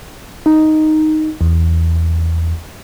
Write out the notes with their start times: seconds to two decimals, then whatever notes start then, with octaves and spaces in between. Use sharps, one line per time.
0.46 D#4
1.41 E2